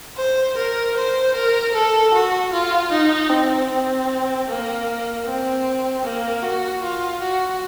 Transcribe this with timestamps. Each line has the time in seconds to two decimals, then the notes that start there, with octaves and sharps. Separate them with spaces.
0.17 C5
0.57 A#4
0.96 C5
1.35 A#4
1.74 A4
2.14 F#4
2.52 F4
2.92 D#4
3.30 C4
3.69 C4
4.47 A#3
5.26 C4
6.04 A#3
6.43 F#4
6.83 F4
7.21 F#4